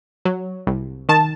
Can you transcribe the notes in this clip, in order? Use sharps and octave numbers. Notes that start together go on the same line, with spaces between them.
F#3
C2
D#3 A5